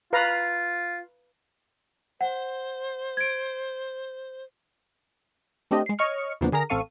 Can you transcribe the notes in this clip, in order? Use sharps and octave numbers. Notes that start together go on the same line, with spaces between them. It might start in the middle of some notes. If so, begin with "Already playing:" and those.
F4 B4 F5 A#5
C5 F#5
G#6 D7
A3 C4 D4 G4 D#5
G#3 C7
C#5 D#5 C#6 F6 C#7
E2 C#3 F3 A#3 B3 D4
D3 G#4 A#4 A#5 A#6
A1 C4 A4 F5 C#6 D#7